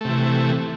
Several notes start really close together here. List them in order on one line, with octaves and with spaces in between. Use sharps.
A3 C3 E3